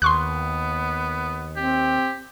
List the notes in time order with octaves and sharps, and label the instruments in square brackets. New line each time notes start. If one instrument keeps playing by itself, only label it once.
[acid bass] D#2 [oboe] B3 [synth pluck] C6 C#6 F#6
[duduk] C4 [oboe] G4